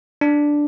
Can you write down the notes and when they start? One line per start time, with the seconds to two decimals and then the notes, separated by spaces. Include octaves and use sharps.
0.21 D4